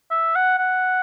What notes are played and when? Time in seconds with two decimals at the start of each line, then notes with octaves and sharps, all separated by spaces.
0.11 E5
0.35 F#5
0.58 F#5